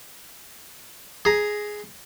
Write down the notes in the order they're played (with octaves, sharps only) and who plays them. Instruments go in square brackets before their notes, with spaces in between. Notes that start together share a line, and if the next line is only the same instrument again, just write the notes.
[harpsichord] G#4 A#5